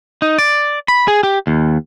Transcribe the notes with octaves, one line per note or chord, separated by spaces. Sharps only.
D#4
D5
B5
G#4
G4
D#2